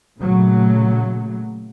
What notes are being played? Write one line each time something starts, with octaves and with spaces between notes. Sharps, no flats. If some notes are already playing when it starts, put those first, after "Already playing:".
A#2 C#3 F#3 A3